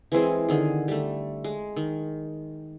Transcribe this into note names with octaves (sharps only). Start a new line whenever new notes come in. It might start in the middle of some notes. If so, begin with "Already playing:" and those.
E3 G#3 C4 G#4
D3 D#3 G#4
G3 A3
G#3
D#3